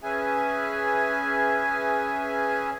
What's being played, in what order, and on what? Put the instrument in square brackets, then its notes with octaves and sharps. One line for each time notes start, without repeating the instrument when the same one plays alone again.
[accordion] C#4 G#4 B4 E5 G#5